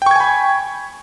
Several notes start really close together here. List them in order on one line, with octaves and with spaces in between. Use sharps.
G5 C#6 G#6 G#5 B5